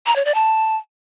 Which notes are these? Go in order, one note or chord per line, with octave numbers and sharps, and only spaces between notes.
A#5
C#5
D5
A5